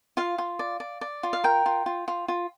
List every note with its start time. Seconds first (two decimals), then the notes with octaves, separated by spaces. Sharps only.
0.17 F4 F5
0.38 F4
0.59 D5
0.80 D5
1.01 D5
1.23 F4
1.33 F5
1.44 A#4 G5
1.66 F4
1.86 F4
2.08 F4
2.28 F4